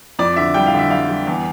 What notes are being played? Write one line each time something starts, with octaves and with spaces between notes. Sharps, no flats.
F2 D5
D3 E5
G3 G5
F5
D3 E5
G3 F5
G3
E2